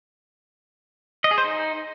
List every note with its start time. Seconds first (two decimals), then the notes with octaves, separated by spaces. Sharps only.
1.24 D#5
1.31 G#4
1.38 C5
1.44 D#4